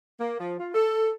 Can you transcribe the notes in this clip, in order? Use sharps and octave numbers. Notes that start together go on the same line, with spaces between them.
A#3
F3
F4
A4